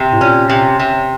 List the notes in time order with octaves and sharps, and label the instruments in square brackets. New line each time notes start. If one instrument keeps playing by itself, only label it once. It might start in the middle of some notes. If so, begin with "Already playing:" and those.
Already playing: [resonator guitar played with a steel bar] C3
[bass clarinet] A2
[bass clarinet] A#2 [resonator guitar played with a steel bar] C#4
[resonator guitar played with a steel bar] C3
C3